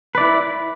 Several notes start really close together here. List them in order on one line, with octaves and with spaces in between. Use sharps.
B4 D5 E4